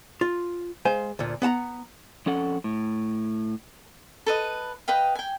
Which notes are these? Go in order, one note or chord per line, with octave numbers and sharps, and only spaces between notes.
F4
G#3 C5 F5 G#5
D2 A#2
B3 F#5 A5 A#5
F2 C#4 A4 F#5
A2
A4 B4 D#5
B4 D#5 F5 G5
G5 G#5